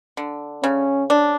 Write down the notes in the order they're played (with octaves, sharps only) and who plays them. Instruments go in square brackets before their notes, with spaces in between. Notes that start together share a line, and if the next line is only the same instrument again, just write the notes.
[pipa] D3
[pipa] C#3 [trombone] C#4
[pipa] D4